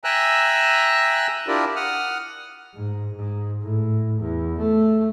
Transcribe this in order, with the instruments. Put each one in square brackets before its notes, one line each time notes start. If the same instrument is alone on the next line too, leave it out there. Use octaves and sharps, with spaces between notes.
[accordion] E5 G5 G#5 A#5 E6 F#6
D4 E4 F4 G4 A#4 D5
F#5 D#6 F6
[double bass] G#2
G#2
A2
E2
A3